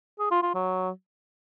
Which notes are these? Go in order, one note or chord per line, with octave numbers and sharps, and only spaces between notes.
G#4
F4
F4
F#3